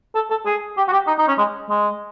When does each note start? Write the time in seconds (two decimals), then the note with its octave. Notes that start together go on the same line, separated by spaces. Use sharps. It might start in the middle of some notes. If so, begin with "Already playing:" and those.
0.15 A4
0.30 A4
0.46 G#4
0.77 G4
0.88 F#4
0.92 G4
1.07 D#4
1.18 D#4
1.28 C#4
1.38 G#3
1.70 G#3